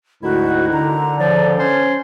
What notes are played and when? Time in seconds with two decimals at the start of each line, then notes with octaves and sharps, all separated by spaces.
0.23 D2 G#2 D#3 D#4 E4 F#4
0.73 D3 A#5
1.19 C#3 F3 D5
1.58 C#4 C5 C#5